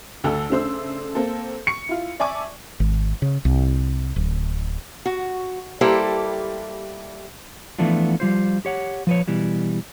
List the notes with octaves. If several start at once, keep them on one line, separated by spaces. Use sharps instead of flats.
D2 D3 A4 E6
C#3 A3 D4 C5 E6
A#3 C4 A4
C#6 C#7
E4 F4
D5 E5 G#5 A5 C#6 D6
G#1
C#3
C2
D1
F#4
G3 A#3 E4 G4 A4 C5
E3 F3 A3 B3 D4 F4
F3 G3 F4 C5
G4 C#5 F#5
F3 B4 C#5
B2 E3 G3